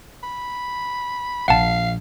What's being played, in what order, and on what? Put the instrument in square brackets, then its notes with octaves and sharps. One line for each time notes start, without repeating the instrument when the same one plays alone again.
[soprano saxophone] B5
[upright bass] A#1 [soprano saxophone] F5 [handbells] F#5 A5